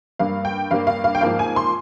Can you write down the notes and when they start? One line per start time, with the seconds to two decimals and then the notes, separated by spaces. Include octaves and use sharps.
0.19 G2 G3 A#3 F5
0.45 G5
0.71 G2 G3 A#3 F5
0.87 F5
1.04 F5
1.15 G5
1.21 G#2 F3 A#3 F5
1.39 G#5
1.56 C6